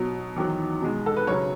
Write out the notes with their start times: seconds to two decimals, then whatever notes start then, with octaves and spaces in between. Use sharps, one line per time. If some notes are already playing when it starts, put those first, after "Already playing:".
Already playing: B2 F#3
0.36 E2 D#3 F#3
0.82 B2 G#3
1.06 A4
1.17 B4
1.27 F#2 C#3 F#3 C#5